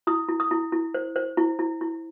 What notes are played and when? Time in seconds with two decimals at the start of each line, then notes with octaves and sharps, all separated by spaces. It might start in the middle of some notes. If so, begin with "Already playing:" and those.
0.07 E4 D#6
0.28 E4
0.40 D#6
0.51 E4
0.72 E4
0.94 C5
1.16 C5
1.37 E4
1.59 E4
1.81 E4